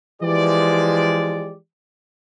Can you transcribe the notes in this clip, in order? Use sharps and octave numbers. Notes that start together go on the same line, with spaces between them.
E3 F3 G#3 G4 D5